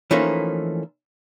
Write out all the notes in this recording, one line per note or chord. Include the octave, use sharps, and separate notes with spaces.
E3 F3 A3 A#3 C#4 D#4